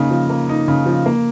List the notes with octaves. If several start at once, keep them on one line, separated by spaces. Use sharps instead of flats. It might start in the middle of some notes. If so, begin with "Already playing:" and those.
Already playing: C#3 A#3 D#4
F3
A#3
D#4
C#3
F3
A#3